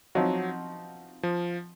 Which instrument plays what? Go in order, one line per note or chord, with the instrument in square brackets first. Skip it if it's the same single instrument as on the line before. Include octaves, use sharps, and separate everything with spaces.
[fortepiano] F3 C4 D#4 F#4 [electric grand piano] F#3
[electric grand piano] F3